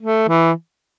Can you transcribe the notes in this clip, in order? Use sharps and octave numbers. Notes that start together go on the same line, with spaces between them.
A3
E3